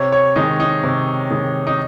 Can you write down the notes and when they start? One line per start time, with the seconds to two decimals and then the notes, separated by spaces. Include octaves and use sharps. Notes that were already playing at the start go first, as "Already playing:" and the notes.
Already playing: C3 C#5
0.12 C#5
0.36 D#3 G#3 D#4
0.60 D#4
0.83 C3
1.31 D#3 G#3
1.67 D#4